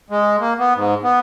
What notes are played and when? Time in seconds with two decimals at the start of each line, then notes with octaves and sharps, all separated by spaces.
0.10 G#3
0.40 A#3
0.59 B3
0.75 G#2
1.03 B3